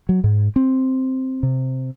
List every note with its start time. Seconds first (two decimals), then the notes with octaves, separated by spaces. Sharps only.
0.09 F#3
0.24 G#2
0.56 C4
1.43 C3